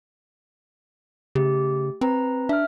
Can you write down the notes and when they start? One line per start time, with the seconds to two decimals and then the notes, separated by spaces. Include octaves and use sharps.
1.35 C#3 A3 G4
2.01 C4 B4 A#5
2.49 D4 E5 F6